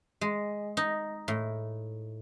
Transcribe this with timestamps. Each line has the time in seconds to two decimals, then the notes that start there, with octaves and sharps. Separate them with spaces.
0.21 G#3
0.77 D#4
1.28 A2